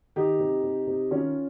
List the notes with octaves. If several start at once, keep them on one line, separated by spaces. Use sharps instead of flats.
D#3 D#4 G4
C3
C3
C3
D#3 C#4 F4